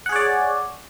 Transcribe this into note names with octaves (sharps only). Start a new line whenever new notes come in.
G#4 C#5 D5 F#5